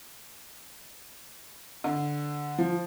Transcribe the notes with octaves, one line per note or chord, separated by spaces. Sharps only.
D3
F3